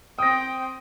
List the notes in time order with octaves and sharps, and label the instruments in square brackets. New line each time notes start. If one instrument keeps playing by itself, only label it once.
[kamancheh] C4 G5 [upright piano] D#6 A#6